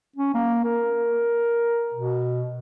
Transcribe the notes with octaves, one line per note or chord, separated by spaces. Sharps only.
C#4
A#3
A#4
B2